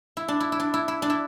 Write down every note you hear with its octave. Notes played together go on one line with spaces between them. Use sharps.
E4
D4
E4
E4
D4
E4
E4
D4
E4